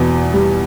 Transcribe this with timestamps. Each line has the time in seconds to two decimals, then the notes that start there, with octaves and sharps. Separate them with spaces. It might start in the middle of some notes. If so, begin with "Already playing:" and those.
Already playing: E2 B2 B3
0.34 G3